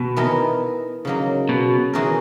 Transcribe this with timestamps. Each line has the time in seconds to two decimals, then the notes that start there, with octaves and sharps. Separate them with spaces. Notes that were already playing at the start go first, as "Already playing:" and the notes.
Already playing: B2
0.16 E3 B3 D#4 A#4
1.05 C#3 F#3 A#3 D#4
1.49 B2
1.93 E3 G#3 D#4 F#4 A#4